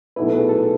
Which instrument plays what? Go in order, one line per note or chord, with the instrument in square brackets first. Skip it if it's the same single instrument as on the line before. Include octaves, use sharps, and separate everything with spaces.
[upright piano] B1 B2 A3 E4 [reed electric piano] B4
[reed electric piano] A4
G#4
A4